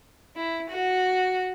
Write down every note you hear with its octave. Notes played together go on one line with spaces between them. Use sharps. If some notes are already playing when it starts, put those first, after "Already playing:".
E4
F#4